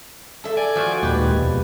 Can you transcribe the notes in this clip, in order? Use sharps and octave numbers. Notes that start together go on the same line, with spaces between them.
A4 E5
D5 G#5
F3 F#4
D#2 A#2 G#3 G4 B4
F2 B2